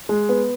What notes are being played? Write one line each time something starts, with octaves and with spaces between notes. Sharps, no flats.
G#3
B3